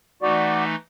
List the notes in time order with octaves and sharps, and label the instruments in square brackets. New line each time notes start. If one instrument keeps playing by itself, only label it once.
[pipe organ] E3 A3 D#4 [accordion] F#4 D5